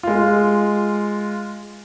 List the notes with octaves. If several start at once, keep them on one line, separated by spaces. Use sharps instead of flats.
G#3 F4